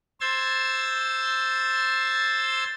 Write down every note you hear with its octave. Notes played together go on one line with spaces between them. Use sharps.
C5 C6 E6 G#6 A6